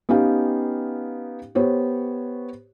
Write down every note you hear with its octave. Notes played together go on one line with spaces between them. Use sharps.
B3 C#4 D#4 G4 F5 G5
B3 G4 C5 C#5